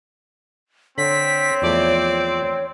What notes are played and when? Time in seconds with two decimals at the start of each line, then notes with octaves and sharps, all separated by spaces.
0.98 D3 C4 C#5 B6
1.62 E2 F3 A3 D5